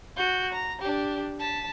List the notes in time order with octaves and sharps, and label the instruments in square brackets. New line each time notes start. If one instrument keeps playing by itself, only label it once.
[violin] F#4 G6
A#5
D4 G4
A5 B6